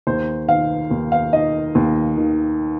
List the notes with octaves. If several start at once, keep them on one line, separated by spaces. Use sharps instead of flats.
D#2 C5
D#3 F5
D#2
F5
D#3 D#5
D#2
D#3